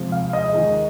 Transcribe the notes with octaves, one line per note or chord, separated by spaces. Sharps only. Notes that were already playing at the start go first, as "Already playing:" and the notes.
Already playing: F2 C3 F3 G#3
F5
D#5
D#2 D#3 G#3 D#4 G#4